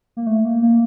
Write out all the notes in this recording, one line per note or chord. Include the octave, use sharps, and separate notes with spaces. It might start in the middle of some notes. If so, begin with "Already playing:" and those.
A#3
A3
A#3
A#3